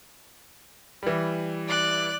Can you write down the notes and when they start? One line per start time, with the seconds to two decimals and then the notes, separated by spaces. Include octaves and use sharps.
1.03 E3 G3
1.67 D5 F#6